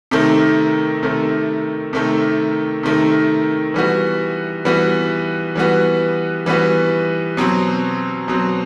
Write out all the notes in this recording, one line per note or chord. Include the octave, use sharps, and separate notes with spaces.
C3 D#3 A3
C3 D#3 A3
C3 D#3 A3
C3 D#3 A3
E3 G3 B3 F#4
E3 G3 B3 F#4
E3 G3 B3 F#4
E3 G3 B3 F#4
B2 F#3 C4
B2 F#3 C4